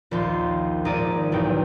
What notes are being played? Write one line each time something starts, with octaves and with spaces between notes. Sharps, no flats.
A#1 D#2 F4 C6
G#1 D#4 G#4 A#4 D5 D#7
B1 E2 G#2 G5